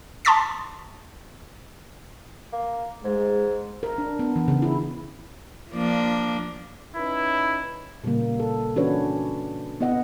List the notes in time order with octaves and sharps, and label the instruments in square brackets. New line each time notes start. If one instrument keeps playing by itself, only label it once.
[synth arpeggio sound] A5 C6 C#6 D#6 A6 B6
[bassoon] A#3
[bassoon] G#2 [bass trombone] G#3
[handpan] A#4
D4
B3
E3
C#3
E4
[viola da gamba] F3 A#3 D4
[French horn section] C#4 D#4 B4 [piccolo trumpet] E4
[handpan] A#2 C#3 G3 A#3
A4
E3 C#4 D4 F#4 B4 C#5
B3 E4 D#5 F#5